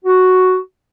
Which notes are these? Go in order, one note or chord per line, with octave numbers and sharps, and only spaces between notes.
F#4